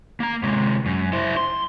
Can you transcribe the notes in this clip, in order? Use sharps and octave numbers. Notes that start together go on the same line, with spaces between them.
A#3 A#5
C3 G#3
F#2
E4 C5
C6